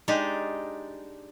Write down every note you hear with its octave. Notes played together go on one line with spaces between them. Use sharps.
G#3 D4 D#4 G4